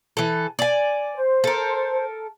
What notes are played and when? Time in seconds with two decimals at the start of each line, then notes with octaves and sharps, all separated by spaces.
0.17 E3 A4
0.59 D5 G#5
1.14 C5
1.44 A4 A#4